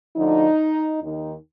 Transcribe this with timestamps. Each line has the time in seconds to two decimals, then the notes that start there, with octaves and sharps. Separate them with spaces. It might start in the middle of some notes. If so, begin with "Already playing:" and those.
0.16 D2 D3 F3 D#4
1.02 D#2 D#3 D#4